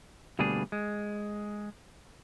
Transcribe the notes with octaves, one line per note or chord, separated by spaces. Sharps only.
D2 B2 G3 A#3 D4 G#4
G#3